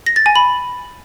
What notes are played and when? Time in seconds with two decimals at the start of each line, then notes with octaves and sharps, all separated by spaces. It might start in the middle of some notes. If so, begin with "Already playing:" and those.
0.06 A#6
0.16 A6
0.26 G#5
0.36 B5